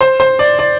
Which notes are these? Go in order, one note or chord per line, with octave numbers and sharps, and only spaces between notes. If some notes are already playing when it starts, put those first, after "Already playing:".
C5
C5
D5
D5